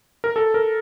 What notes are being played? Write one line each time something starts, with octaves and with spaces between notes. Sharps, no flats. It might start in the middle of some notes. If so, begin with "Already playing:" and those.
A#4
A4
A#4